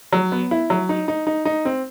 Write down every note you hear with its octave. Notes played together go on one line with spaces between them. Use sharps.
F#3
B3
E4
F#3
D#4
D#4
D#4
D#4
C4